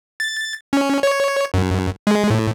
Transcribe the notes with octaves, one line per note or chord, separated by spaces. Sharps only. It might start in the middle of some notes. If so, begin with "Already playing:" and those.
A6
C#4
C#5
F#2
G#3
A2